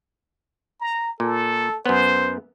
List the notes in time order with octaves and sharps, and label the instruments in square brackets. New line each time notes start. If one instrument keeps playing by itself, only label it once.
[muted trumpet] A#5
[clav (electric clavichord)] A#2 [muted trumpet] A4
[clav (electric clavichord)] F#2 B3 [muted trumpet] C5